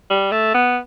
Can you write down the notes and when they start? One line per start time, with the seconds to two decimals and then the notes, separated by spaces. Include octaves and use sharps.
0.10 G3
0.32 A3
0.54 B3